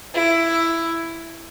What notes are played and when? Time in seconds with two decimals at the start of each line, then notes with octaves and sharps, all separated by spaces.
0.14 E4